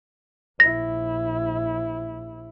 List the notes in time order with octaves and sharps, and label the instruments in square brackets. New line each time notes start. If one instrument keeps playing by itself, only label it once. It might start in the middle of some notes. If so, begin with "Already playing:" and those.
[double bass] A#1 E4 [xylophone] A#6